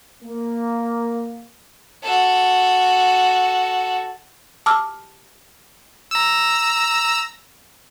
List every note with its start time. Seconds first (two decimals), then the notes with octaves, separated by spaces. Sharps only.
0.23 A#3
2.03 F#4 A4
4.66 A5 D6 E6 F6
6.11 A#5 E6